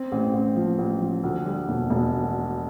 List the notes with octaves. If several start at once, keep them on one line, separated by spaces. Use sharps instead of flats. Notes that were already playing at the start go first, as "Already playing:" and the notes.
Already playing: C4
A1
A1
F3
A1
F3
D2
G3
E1
E1